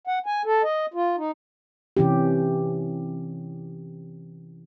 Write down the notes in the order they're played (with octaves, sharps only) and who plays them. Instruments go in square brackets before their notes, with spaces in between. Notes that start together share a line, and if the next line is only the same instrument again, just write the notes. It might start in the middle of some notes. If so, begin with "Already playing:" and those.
[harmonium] F#5
G#5
A4
D#5
F4
D#4
[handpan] C3 E3 C#4 G4